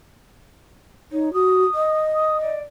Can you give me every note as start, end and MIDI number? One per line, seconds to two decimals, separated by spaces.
1.12 1.33 63
1.12 1.33 73
1.33 1.64 66
1.33 2.01 87
1.75 2.56 75
2.13 2.40 87
2.40 2.62 74